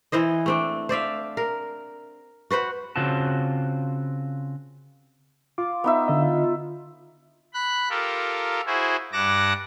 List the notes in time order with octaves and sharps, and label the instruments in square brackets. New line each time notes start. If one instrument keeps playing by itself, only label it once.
[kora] E3 E4 C5 D#5
A3 C4 D4
C5 D5 E5 F5
A#4
F#4 B4 C5 F#5
[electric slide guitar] C#3 C4 F4 F#4 A5
[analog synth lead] F4 [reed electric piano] D6
[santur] B3 D#4 E5
[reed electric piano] D3 D#5
[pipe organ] B5 F#6
F4 G4 A4 A#4
E4 F#4 G#4 C5
G2 F#5 A5 D6 A#6